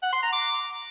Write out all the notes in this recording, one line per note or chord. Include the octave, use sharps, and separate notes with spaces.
F#5
C6
A#5
D6